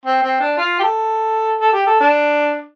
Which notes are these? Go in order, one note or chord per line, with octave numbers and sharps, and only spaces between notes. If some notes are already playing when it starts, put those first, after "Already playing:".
C4
C4
D4
F4
G4
A4
A4
G4
A4
D4